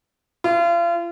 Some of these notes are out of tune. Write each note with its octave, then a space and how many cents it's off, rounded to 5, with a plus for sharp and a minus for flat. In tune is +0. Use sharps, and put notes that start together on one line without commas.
F4 -35